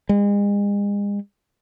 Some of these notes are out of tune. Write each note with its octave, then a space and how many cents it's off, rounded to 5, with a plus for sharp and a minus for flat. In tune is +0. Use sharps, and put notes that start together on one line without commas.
G#3 -40